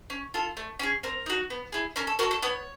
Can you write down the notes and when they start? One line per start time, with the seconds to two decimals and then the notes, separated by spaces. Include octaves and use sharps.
0.10 C#4
0.34 F4 A4
0.57 A3
0.79 C#4 F4 G#4
1.03 C4 A#4
1.26 D#4 F#4
1.50 B3
1.72 E4 G#4
1.96 C#4 A#4
2.07 A4
2.19 F#4 A4 A#4
2.31 A4
2.42 B3 C#5